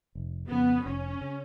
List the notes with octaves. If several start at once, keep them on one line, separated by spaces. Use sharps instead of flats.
F1
F2 C#3 B3
F1 C#4
C#3